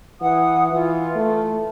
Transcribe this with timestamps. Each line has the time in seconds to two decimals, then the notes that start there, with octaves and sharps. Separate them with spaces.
0.22 E3 F#5 D#6
0.73 E3 F4
1.16 A3